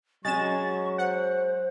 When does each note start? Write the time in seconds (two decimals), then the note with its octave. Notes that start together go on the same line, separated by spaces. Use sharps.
0.25 F#3 G#3 C#4 C#6 A6 E7
0.98 C5 F#5